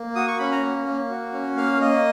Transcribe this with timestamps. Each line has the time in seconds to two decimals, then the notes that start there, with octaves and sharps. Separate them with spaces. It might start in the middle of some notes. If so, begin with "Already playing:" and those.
Already playing: A#3
0.16 F#4 D#6
0.28 C#6
0.39 C#4 B5
0.52 A#5
0.62 A#3
0.86 A#3
1.10 F#4
1.33 C#4
1.56 A#3 F5
1.80 A#3 D#5